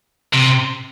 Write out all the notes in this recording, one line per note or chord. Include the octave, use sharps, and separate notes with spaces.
C3